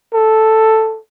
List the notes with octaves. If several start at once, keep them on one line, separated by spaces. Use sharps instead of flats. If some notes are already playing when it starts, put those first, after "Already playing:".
A4